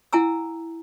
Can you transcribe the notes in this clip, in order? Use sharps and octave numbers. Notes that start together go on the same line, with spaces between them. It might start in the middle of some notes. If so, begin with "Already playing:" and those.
E4 F#5 G#5 A#5 E6